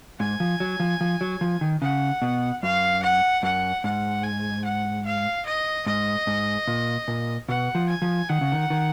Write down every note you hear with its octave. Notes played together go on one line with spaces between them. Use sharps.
G#2 G#5
F3
F#3
F3
F3
F#3
F3
D#3
C#3 F#5
B2
F#2 F5
F#5
F#2 F#5
G#2 F#5
G#5
F#5
F5
D#5
G#2 D#5
G#2
A#2
A#2
B2 F#5
F3
G#5
F3
D#3 F#5
C#3
D#3
D#3